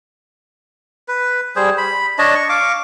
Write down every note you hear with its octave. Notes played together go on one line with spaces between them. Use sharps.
B4
G3 G#4 C5
B5
D4 C#5 D#5 A5
C#6
F5 C#6 D6